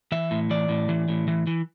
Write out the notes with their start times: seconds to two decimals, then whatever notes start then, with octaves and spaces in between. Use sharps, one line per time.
0.12 E3 E5
0.31 A2
0.51 E3 D5
0.69 A2
0.89 E3
1.08 A2
1.28 E3
1.47 E3